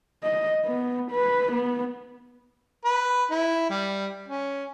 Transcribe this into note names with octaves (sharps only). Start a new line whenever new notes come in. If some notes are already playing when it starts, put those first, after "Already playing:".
D#5
B3
B4
B3
B4
E4
G3
C#4